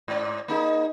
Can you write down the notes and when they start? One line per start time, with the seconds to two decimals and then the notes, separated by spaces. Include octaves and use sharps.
0.08 G#2 D5
0.48 A#3 D#4 G#4